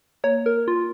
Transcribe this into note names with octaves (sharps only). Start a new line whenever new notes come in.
A#3 C#5
A#4
F4